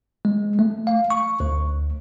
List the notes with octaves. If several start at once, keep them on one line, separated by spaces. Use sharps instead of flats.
G#3
A3
F5
C#6
D2